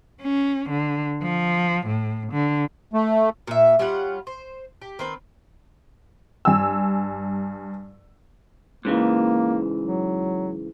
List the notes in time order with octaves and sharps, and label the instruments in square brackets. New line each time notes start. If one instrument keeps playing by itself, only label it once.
[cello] C#4
D3
F3
A2
D3
[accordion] A3
[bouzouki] A#2 E5
G3 C#4 F4 F#5
C5
G4
D#3 C4 B4
[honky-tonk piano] G2 G#5 E6
[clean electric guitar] G#2 C#3 E3 [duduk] A#3
[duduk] F#3